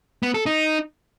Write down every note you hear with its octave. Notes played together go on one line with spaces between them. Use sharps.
B3
A4
D#4